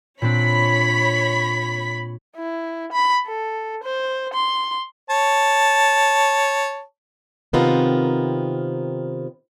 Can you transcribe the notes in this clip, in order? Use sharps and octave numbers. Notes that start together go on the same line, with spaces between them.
A#2 C4 D4 C#5 B5 B6
E4
B5
A4
C5
C6
C#5 A5
C3 D#3 B3 C4 F4 A#4